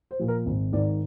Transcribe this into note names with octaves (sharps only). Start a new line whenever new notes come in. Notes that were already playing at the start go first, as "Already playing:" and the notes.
C5
A#2 F3
A#4
G#1
G#2 D#3 D5